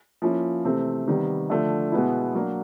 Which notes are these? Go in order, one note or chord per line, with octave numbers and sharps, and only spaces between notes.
F3 A#3 C#4 E4
C3 E3 A3 C4
C3 D#3 G3 B3
D3 F3 A3
B2 G#3 B3 E4
F#3 A#3 D4